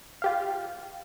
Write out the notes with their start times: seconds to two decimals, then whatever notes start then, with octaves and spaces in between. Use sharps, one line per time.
0.22 F4 G4 F5